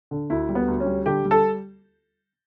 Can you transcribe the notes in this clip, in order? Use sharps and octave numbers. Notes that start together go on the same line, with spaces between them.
D3
D2 E4
G3
B3
D2
C#4
G3
D3 G4
G3
A4